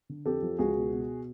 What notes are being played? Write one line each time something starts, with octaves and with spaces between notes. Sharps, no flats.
D3
F2 G4 A4
F3
C#2 F#4 G#4
B2
B2